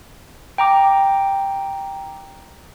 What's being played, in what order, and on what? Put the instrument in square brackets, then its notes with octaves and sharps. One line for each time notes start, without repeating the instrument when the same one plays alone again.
[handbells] G5 A#5 D6